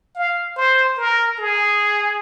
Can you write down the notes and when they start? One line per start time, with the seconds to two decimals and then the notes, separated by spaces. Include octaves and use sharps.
0.15 F5
0.56 C5
0.97 A#4
1.39 G#4